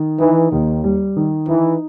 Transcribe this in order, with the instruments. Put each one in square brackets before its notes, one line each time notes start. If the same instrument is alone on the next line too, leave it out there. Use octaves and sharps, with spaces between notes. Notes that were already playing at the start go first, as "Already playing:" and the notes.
Already playing: [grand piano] D#3
[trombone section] E3 [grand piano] D#4
[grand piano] D#2 [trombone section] D#3
[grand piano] G3
D#3
[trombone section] E3 [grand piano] D#4